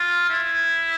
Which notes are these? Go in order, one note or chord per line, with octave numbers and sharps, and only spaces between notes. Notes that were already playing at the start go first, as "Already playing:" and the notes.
Already playing: F4
E4